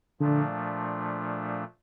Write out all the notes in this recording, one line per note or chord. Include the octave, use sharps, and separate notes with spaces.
A#2 D3 F3 A3 D4